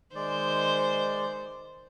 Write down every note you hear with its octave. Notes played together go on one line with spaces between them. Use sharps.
D#3 G#3 C5 D5